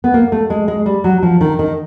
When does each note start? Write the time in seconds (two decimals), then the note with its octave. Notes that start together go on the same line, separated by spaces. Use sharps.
0.04 B3
0.14 A#3
0.32 A3
0.50 G#3
0.68 G#3
0.86 G3
1.04 F#3
1.23 F3
1.41 D#3
1.59 D#3